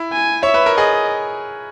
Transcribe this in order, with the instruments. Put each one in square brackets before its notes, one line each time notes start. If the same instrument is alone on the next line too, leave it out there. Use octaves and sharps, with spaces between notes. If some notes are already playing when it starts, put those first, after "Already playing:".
Already playing: [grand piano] E4
[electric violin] G#5
[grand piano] C#5 [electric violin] E5
[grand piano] B4
A#4
[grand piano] G#4 [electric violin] D#5